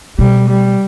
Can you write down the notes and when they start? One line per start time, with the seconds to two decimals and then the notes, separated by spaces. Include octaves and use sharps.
0.18 B2 G3
0.49 G3